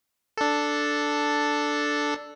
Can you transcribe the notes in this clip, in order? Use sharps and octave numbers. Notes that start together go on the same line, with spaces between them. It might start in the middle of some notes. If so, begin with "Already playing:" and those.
D4 A4